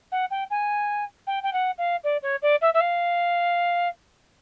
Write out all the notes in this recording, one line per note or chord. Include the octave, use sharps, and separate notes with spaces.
F#5
G5
G#5
G5
G5
F#5
F5
D5
C#5
D5
E5
E5
F5